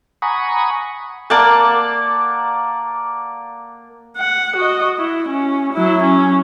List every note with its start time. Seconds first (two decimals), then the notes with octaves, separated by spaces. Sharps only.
0.22 F#5 G#5 A#5 B5 C#6 D#6
1.30 A#3 D5 F#5 A5
4.17 F#5
4.57 F#4 D#5
4.99 E4
5.29 C#4
5.74 F#3 E4
6.03 C#4